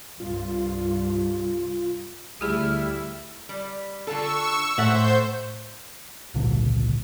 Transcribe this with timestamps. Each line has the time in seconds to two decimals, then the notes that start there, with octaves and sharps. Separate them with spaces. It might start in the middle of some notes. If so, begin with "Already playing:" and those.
0.20 C2 G2 F4
2.41 D2 G3 E4 G4 G#4 E5 F6
3.49 G3
4.07 D3 F4 A4 C#6 E6
4.78 A2 A4 C5 E5 F#5 G6
6.34 G#1 C#2 A#2 D3